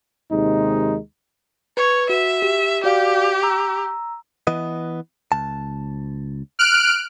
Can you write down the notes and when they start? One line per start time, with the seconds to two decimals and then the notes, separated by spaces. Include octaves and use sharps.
0.32 D#2 C3 G#3 D#4
1.77 B4 C#5
2.09 F#4 E5
2.42 G4
2.84 F#4 G4 D5 F5
3.43 A#5 E6
4.47 E3 B3 D#5
5.32 C#2 A5
6.59 F6 F#6 D7